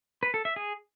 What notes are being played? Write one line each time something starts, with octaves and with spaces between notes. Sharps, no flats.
B4
A4
E5
G#4